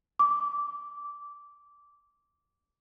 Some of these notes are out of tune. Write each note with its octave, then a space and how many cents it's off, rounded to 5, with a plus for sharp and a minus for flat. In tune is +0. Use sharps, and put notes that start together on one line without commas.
D6 -15